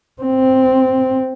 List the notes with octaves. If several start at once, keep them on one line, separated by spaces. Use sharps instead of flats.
C4